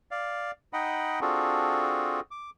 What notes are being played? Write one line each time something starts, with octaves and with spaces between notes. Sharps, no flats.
D5 F5
D#4 D#5 F#5 G5 B5
C4 D4 F4 F#4 G#4 A4
D6